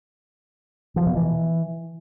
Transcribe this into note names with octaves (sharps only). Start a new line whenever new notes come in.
F3
B2
E3